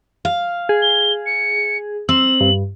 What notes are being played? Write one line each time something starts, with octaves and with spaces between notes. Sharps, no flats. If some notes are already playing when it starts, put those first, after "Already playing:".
F5
G#4
G7
C#7
C4 E6 F#7
G2